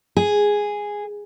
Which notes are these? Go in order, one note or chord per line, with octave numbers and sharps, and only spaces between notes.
G#4